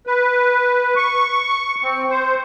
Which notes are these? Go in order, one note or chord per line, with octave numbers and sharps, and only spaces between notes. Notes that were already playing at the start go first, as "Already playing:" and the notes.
B4
C#6
C4
C5